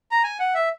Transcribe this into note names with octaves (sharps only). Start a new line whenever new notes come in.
A#5
G#5
F#5
E5